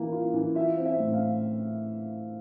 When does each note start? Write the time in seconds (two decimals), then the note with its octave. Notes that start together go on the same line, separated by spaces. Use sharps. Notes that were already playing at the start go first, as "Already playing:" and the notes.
Already playing: E3 A#3
0.12 F4
0.34 E3
0.55 F4 E5
0.77 C4
0.85 E5
0.99 A2
1.14 F5